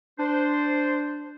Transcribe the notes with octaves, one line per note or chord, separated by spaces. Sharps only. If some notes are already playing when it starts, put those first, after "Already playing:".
D4 C5